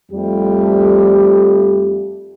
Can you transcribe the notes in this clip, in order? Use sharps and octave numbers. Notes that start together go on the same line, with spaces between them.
F2 F3 G3 A3 G4